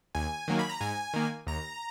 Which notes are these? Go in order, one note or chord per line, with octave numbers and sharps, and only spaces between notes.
D#2 G#5
D#3 F#3 A#3
B5
A#5
G#2 G#5
D#3 A#3
D#2 A#5